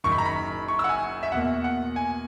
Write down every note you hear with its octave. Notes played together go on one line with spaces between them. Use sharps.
F#1 F#2 D#3 C#6
B5
A#5
B5
C#6
E6
F#5
G#5
E5
E2 B2 A#3 F#5
F#5
G#5